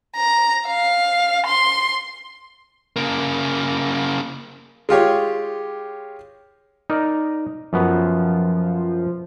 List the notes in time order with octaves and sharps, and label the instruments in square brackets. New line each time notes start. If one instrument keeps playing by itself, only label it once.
[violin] A#5
F5
C6
[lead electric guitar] C#3 A#3
[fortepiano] G#3 F4 G4 C#5
[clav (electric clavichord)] D#4 A#4 D5
[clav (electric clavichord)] F#2 B3 [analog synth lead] F3